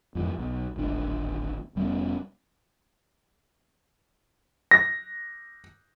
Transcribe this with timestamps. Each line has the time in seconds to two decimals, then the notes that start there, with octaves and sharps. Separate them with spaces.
0.15 F2 G#2 E3
0.38 B1
0.76 D1 G#1 D4
1.76 F1 G3 B3 C#4
4.71 A#6